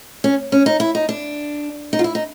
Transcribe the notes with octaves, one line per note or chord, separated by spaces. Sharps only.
C#4
C#4
D#4
E4
D#4
D4
D#4
F4
E4
D#4